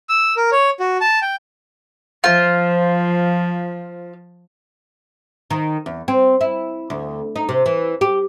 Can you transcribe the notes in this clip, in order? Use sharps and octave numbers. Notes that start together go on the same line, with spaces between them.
E6
A#4
C#5
F#4
A5
G5
F3 F4 C5
D#3
E2
C4
E4
D2
D#4
C3
E3
G4